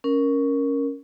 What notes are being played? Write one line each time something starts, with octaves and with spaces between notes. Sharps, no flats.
C#4 A#4